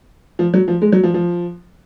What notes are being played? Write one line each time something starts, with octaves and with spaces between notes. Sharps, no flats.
F3
F#3
F3
G#3
F#3
F3
F3